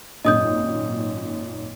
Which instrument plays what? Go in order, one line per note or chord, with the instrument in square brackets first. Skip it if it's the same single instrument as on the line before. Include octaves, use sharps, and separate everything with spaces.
[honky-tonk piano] G#1 F#2 A#2 [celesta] D#5 D#6 G6